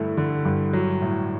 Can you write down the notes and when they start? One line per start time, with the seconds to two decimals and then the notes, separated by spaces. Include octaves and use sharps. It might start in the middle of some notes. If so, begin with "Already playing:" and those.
Already playing: G2 D3 A3 E4
0.17 D3
0.45 G2
0.73 F#3
1.02 A2